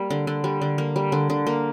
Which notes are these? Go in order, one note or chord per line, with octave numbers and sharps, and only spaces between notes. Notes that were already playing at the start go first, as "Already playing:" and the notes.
Already playing: G3 A#3
D3
D3
G3
D3
A#3
G3
D3
D3
A#3